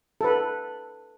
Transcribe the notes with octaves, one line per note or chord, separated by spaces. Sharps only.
A4 B4